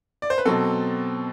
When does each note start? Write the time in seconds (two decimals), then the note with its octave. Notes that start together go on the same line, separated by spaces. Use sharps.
0.22 D5
0.30 C5
0.38 B4
0.45 B2 F#3 C4 A4